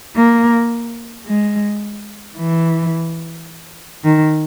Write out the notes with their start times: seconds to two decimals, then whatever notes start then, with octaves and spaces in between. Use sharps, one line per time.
0.16 A#3
1.27 G#3
2.38 E3
4.04 D#3